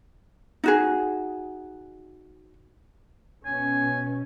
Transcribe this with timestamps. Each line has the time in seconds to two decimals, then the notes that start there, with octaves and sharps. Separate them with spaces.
0.64 D#4 F#4 G#4
3.45 B2 C#4 G#5